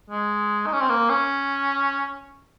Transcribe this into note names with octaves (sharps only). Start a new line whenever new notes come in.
G#3
D#4
C#4
C4
A#3
C#4